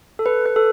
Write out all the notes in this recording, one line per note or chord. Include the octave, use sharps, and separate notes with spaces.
A4
B4
B4
A4